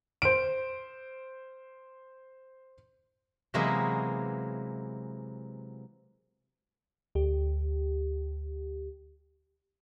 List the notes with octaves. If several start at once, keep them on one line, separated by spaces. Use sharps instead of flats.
C5 D7
C3 E3 F#3 G#3 A#3 B3
D2 G4